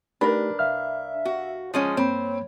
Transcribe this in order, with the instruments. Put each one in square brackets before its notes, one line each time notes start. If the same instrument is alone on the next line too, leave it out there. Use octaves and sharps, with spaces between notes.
[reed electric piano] A3 D#4 G4 [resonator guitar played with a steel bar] D4 [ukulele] A#4 B4
[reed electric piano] C2 F5 F6 [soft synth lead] E5
[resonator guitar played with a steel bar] F#4
[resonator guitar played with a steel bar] F3 G#3 C#4 [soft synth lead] D#6
[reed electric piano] G2 A#3 B5 [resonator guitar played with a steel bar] C4 [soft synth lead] C#5